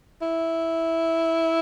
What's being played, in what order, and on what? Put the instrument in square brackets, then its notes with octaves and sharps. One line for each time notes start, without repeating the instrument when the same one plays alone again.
[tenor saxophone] E4